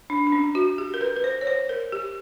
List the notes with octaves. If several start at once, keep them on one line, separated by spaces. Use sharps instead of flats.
D4
D4
C#4
F#4
G4
A#4
B4
B4
C5
C#5
C5
A#4
G4